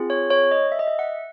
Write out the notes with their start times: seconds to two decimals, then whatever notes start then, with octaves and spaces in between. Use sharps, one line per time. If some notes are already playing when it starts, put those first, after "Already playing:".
Already playing: C4 F4 G#4
0.10 C#5
0.30 C#5
0.51 D#5
0.72 E5
0.79 D#5
0.88 E5
0.99 F#5